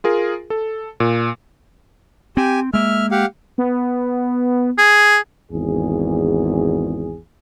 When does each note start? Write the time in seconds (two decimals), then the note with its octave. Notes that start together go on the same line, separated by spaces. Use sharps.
0.04 F4 G#4 A#4
0.50 A4
1.00 A#2
2.37 C4 G4 G#5
2.73 G#3 A#3 E5 F6
3.11 G4 F5 F#5
3.58 B3
4.78 G#4
5.52 G#1 E2 G#4